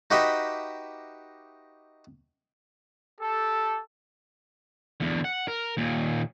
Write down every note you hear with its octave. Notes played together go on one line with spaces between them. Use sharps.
D#4 F#4 G4 B4 D#5 E5
G4 A4
E2 D3
F#5
A#4
D#2 A#2